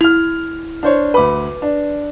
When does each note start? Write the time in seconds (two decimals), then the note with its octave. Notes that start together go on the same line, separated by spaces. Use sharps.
0.01 E4 F6 F7
0.83 D4 C5 C#5
1.14 D2 B4 B5 D6
1.62 D4